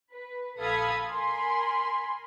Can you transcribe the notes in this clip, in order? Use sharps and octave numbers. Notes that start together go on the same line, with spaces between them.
B4
A#1 A4 F5 B5 D#6 G#6
A#4 G#5 B5 C6